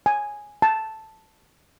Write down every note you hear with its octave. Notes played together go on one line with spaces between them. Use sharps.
G#5
A5